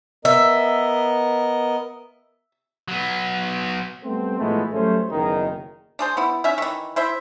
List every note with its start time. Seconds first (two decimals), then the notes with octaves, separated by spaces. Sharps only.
0.25 B3 A#4 D#5 E5
2.88 F#3 B3
4.04 G3 A3 B3 C4
4.39 A2 E3 F3 G#3 A3 B3
4.73 F#3 G3 A3 C#4 C5
5.10 F#1 B1 E2 D#3 D#4 G#4
5.99 D4 G#4 C5
6.17 B3 E4
6.44 C#4 D#4 E5
6.58 D#3 E3
6.96 E4 C5 E5